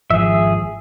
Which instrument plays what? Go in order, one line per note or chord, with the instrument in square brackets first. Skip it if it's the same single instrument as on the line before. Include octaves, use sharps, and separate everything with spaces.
[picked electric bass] G#1 F3 [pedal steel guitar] G#4 E5